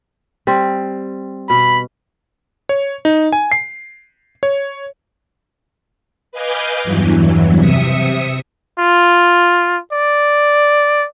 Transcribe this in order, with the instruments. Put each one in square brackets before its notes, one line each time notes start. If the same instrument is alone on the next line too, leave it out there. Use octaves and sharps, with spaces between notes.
[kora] G3 C4
[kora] B2 [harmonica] B5
[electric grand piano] C#5
D#4
G#5
C7
C#5
[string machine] B4 D#5 F5 G#5 D6 G6
E2 G2 E3 F#3
C3 E5 D#6 C#7
[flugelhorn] F4
D5